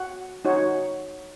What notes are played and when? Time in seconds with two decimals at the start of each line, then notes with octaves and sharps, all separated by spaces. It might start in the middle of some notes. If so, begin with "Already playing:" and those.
Already playing: F#4 F#5
0.45 D#4 F#4 C#5